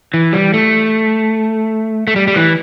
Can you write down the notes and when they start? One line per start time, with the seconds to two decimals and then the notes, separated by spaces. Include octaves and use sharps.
0.14 E3
0.33 G3
0.54 A3
2.07 A3
2.16 G3
2.28 G3
2.36 E3